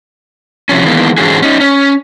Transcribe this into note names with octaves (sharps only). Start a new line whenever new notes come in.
C3 F3 C#4
D#3 E3 G#3 A#3 B3
G#2 D3 E3 C#4 F#4 G#4
C#4 D#4
C#4